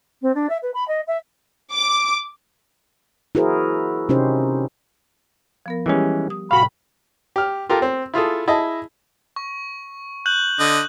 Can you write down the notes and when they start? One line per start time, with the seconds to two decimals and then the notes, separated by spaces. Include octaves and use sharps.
0.22 C4
0.34 D4
0.49 E5
0.62 B4
0.74 B5
0.88 D#5
1.07 E5
1.73 D6
3.35 E4 F#4 G#4 A#4 C5
4.09 C3 C#4 D#4 G4 C5
5.66 F3 B3 A#4
5.86 E3 G3 G#3 C#4 G4
6.30 D#6
6.51 A2 C3 F#4 F5 G5 B5
7.36 G4 F6
7.69 F4 G4 A4 A#4
7.82 C4
8.14 E4 F4 G#4 A4
8.48 E4 G#4 D#5 A5
9.36 C#6
10.26 F#6 G6 F#7
10.60 D3 D#5